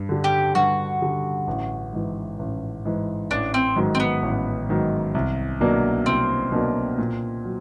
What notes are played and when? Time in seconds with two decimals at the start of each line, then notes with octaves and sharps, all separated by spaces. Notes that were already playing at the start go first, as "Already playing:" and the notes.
Already playing: G2
0.09 D3 G3
0.24 G4
0.55 G2 F#4
1.01 D3 G3
1.47 A1
1.93 G#2 E3
2.39 A1
2.85 G#2 E3
3.31 A1 D4
3.54 C4
3.76 G#2 D#3 F#3
3.95 C4
4.00 B3
4.22 A1
4.69 G#2 D#3 F#3
5.15 C2
5.61 B2 F#3 A#3 D4
6.06 C2 C4
6.52 B2 F#3 A#3 D4
6.98 A#2
7.45 F#3